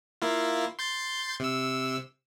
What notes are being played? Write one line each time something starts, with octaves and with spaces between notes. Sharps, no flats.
A#3 E4 F4
C6 G6 A6
C3 E6